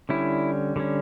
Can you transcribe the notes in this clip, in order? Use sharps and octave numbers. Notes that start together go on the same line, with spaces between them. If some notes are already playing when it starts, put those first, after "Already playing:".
D3 G3 C#4 E4
D3 G3 C#4